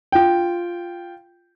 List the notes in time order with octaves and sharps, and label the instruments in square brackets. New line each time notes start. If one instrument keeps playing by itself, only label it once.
[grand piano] F4 G5